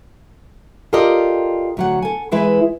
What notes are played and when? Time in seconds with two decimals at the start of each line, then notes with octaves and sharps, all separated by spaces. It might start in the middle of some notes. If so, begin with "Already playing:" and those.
0.93 F4 G4 A4 A#4 D5 D#5
1.77 D2 F#3 F#5
2.02 A4 G#5
2.32 E3 G#3 E4 B4